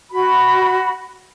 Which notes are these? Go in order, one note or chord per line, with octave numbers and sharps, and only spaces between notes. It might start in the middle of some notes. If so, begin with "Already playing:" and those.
F#4 B5